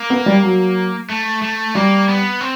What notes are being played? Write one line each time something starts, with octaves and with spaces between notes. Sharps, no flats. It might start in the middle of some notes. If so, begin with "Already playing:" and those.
Already playing: A#3
B3
G3
F#3
A3
A3
G3 A#3
B3
C4